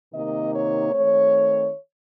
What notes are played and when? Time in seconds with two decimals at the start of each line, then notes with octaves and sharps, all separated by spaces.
0.13 C3 D#3 A#3 D#4 D#5
0.53 C#5
0.92 D#3 A3 C4 C#5